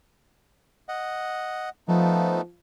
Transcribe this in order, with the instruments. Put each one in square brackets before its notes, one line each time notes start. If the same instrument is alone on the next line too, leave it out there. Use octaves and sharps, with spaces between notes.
[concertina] D#5 F#5
[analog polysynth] F3 [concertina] A3 B3 D#4